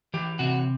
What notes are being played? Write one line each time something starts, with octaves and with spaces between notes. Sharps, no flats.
E3 G4
C3 F#4